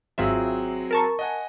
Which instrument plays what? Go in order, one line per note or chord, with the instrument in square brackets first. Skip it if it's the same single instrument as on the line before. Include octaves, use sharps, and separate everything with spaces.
[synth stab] G#1 F4 E5 [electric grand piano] F#3 C4 G#4
[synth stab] A#4 A5 C#6
[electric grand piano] D#5 F#5 G#5